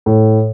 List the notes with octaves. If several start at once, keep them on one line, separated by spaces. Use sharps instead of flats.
A2